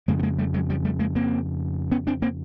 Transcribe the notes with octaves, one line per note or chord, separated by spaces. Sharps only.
F2 C#3 G#3 A#3
B3
G#3 A#3
G3 A3
F#3 G#3
F3 G3
G3 A3
G#3 A#3
A#3 C4
B3 C#4
C4 D4
A#3 C4